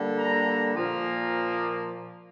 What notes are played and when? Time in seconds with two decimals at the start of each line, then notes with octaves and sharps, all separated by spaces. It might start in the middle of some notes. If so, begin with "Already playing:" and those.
Already playing: D3 G3 A#3
0.17 A#5
0.75 A#2 F3 A#3